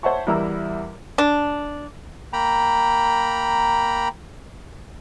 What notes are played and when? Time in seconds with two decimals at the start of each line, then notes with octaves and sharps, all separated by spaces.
0.03 C5 C#5 E5 F#5 A5 C#6
0.27 E2 G3 E4 A#4 A#5 E6
1.18 D4
2.33 A#3 G5 A#5 B5